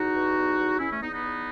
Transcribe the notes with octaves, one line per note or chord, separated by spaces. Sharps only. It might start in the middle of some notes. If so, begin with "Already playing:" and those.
Already playing: E2 D#4 F#4
B2
E2
E2
E2 C#4 E4
A3 C#4
E2 B3 D#4
B3 D#4
E2